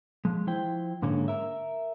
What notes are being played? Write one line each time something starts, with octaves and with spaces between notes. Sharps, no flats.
F3 G#3
F3 E4 C5 G5
G#2 D3 G#3 A#3 C#4
A#4 E5